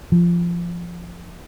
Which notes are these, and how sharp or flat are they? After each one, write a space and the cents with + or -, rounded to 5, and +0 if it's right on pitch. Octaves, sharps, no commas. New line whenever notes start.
F3 -15